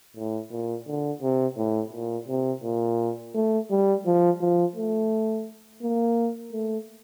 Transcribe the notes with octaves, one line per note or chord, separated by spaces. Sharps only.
A2
A#2
D3
C3
A2
A#2
C3
A#2
A3
G3
F3
F3
A3
A#3
A3